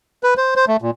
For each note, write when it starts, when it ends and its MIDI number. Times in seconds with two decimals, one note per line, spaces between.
0.23 0.34 71
0.37 0.54 72
0.56 0.65 72
0.67 0.77 57
0.82 0.91 46